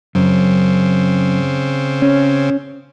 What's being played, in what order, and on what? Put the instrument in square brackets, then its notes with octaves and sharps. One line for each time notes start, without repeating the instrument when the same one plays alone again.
[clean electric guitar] F#2 [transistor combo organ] C#3 C4
[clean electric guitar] C#4